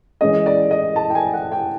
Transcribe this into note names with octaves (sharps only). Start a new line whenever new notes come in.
E3 G#3 C#4 D#5
D5
D#5
A5
G5
G#5
F#5
G5